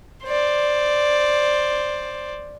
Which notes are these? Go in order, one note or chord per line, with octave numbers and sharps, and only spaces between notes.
C5 D5